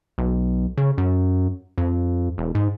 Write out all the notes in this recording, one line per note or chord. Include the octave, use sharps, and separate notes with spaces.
B1
C#3
F#2
F2
E1
G#2